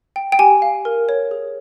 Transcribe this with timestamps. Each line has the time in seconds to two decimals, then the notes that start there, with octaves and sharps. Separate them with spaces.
0.16 G5
0.32 G5
0.39 G4 G#5
0.62 F5
0.85 A#4
1.09 C#5
1.31 G#4